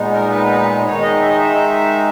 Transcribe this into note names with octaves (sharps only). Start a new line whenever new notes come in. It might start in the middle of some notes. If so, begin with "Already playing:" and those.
Already playing: A#2 G#3 B3 D#4
A#4
B4
D#3 G#3 D#4 C#5
D#5
E5
D#5
E5